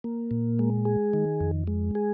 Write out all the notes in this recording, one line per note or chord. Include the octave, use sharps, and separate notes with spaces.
A#3
A#2
G#3
G#4
D#3
F2
G#3
G#4